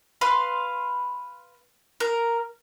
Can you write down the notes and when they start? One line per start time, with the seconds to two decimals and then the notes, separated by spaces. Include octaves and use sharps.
0.21 B4 F5 C6
2.00 A#4